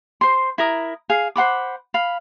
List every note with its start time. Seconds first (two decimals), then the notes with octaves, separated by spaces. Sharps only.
0.21 C5 C6
0.58 E4 A#4 D#6
1.10 G#4 F5
1.36 C5 F#5 B5 D6
1.94 F5 B5